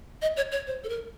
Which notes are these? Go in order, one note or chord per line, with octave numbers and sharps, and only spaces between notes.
D#5
C#5
C#5
C5
A4
A#4